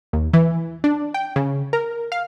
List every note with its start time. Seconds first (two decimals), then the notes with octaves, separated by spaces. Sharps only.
0.13 D#2
0.33 E3
0.84 D4
1.14 G5
1.36 C#3
1.73 A#4
2.12 F5